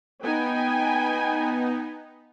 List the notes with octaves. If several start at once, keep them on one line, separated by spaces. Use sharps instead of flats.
B3 D#4 G5 G#5 B5